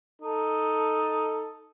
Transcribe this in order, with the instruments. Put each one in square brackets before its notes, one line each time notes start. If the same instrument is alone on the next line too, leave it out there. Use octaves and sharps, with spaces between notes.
[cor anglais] D#4 [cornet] A4